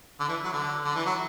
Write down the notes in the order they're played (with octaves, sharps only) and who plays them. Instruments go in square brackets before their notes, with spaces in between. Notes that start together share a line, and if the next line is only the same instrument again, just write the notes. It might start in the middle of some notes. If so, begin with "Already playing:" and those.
[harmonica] D3
E3
F#3
D3
D3
E3
F#3